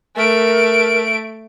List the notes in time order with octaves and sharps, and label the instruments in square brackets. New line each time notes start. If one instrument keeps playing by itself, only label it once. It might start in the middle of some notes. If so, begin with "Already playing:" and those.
[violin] A3 D7 [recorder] A#4